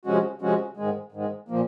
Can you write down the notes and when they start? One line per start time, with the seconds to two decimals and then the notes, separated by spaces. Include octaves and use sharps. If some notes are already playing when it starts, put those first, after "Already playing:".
0.05 C3 F3 G#3 C#4 F#4
0.42 C3 F3 G#3 C#4 F#4
0.77 G#2 D#3 G#3
1.12 G#2 D#3 G#3
1.48 A#2 F3 A#3